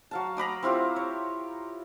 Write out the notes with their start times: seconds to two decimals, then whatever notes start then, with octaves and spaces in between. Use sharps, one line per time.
0.11 F#3 F5 A5
0.37 A#5 B5 D6 D#6
0.63 C4 E4 F4 G4
0.96 C#5